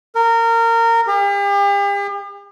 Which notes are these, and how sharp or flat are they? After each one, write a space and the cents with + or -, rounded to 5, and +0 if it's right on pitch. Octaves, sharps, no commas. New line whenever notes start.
A#4 -20
G4 +45